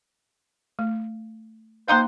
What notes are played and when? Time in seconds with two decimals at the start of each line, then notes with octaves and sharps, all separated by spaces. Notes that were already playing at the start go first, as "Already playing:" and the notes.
0.79 A3
1.88 F3 A#3 D#4 C5 F5 C6